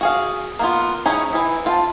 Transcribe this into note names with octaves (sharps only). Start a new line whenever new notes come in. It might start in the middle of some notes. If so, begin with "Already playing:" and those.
F#4 G#4 F5
A#3 B3 F4
C#4 D#4 E4 G#4 C#5
E3 E4
C4 F4 A5